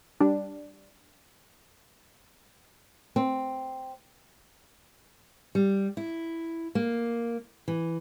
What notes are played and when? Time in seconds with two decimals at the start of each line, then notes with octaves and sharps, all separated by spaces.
0.20 G3 D4
3.16 C4
5.55 G3
5.97 E4
6.75 A#3
7.68 E3